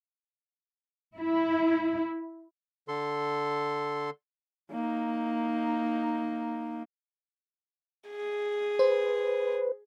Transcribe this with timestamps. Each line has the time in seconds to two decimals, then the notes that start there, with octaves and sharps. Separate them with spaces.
1.17 E4
2.88 D3 A4 C6
4.71 A#3 D#4
8.10 G#4
8.79 B4 C5